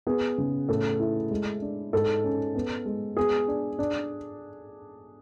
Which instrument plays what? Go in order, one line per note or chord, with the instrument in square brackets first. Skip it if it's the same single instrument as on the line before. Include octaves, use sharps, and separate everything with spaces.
[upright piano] B3 [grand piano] G#4
[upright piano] C#3
[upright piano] A2 [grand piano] A4
[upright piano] E4
G#3
D4
[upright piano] G#2 [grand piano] A4
[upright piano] C#4
B3
G#3
[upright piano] B3 [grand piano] G#4
[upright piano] D4
D4